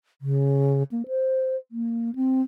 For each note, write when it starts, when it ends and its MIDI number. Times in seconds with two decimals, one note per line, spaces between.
0.22 0.83 49
0.92 1.02 58
1.08 1.56 72
1.72 2.14 58
2.15 2.42 60